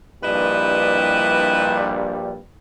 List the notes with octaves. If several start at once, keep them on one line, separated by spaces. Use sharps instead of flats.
A#1 G2 G3 E4 B4 D#5